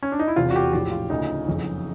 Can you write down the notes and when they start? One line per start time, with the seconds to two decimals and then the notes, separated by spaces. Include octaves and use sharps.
0.03 C#4
0.12 D4
0.19 D#4
0.28 E4
0.36 E1 E2 C3 F4
0.51 F#4
0.56 G4
0.73 A#1 A2 F3 G4
0.91 F4
1.10 D2 C#3 F3 D#4
1.47 F#1 F2 C#3 E3